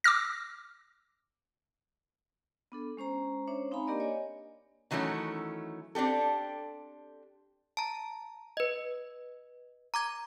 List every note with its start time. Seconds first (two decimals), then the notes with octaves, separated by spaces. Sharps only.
0.04 D6 E6 F6 A#6
2.72 B3 D4 A4
2.97 G#3 C#4 C5 A#5
3.47 C#4 D4 C5 C#5 E5
3.71 C4 D#4 F5 G#5 A#5 B5
3.87 A#3 D4 G4 A#4 D5 D#5
4.00 C#5 D#5 G#5
4.91 D#3 E3 F#3 A3 C#4
5.95 C4 D4 G4 A4
7.77 A5 A#5
8.57 B4 D#5
9.94 A#5 D6 G#6